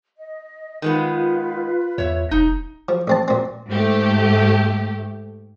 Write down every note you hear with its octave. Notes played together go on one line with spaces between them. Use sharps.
D#5
D#3 G#3 B3 F4 B4
E2 C#5 E5
E1 D#4
F3
A1 C4 A5
A#2 C4
G#2 A3 G4